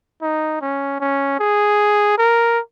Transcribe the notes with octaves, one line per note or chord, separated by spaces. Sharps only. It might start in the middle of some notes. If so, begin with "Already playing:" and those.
D#4
C#4
C#4
G#4
A#4